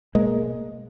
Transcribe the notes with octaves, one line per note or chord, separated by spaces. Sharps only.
B2 G#3 A#3